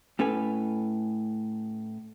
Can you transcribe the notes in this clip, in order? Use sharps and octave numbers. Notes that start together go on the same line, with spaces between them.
A2 C#4 A4 B4 G#5